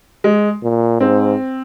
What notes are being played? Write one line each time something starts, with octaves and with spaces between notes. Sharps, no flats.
G#3
A#2
G#2 C4